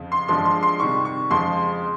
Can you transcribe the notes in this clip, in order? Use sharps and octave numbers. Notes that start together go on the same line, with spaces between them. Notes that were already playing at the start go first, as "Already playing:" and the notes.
Already playing: F2 C#3
C6
G2 F3 G#3 C6
C6
C6
C3 D#3 G3 C#6
C#6
F2 C#3 F3 G#3 C6